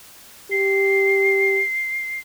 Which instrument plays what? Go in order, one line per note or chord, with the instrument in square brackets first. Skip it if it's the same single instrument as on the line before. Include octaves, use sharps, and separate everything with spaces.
[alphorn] G4 [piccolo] C7